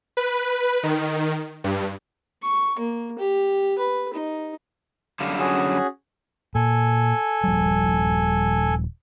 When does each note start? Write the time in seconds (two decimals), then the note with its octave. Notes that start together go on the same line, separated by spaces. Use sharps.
0.17 B4
0.83 D#3
1.64 G2
2.42 C#6
2.79 A#3
3.19 G4
3.78 B4
4.14 D#4
5.20 F#2 D3 G3 F5
5.39 C#4 F#4 G#4
6.55 A#2 A4 G#5
7.44 D#1 F3 G3